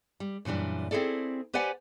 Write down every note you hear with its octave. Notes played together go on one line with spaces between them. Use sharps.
G3
F#2 A#2 E3 G3 D4
C4 E4 G#4 A4 D5
G4 B4 C5 D5 F#5 G#5